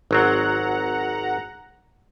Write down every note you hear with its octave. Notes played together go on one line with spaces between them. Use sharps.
G#1 F#3 C4 F#5 A#5